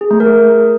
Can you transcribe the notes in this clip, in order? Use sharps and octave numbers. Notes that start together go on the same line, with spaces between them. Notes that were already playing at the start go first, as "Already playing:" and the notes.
G#4
A3
A#4